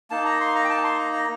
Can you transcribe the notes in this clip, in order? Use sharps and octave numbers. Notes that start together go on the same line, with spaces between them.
A#3 D#4 A5
A#5
C6
A#5
G5
A5
C6
A#5
A#5